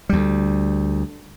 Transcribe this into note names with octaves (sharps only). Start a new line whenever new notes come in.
D2 G3